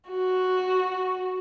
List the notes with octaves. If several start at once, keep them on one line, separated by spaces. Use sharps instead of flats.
F#4